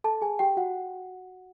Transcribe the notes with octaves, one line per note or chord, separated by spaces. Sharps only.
A4 A5
G#4 G#5
G4 G5
F#4 F#5